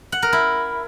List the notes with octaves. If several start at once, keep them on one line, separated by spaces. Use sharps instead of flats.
F#5
A#4
E4